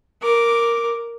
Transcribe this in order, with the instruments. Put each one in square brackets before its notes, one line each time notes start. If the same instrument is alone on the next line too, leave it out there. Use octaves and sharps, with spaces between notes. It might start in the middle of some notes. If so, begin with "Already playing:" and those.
[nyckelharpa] A#4 D6